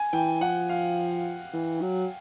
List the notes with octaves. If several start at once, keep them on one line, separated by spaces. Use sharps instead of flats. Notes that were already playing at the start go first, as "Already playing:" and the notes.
Already playing: G#5
E3 G5
F3 F#5
F5
E3
F#3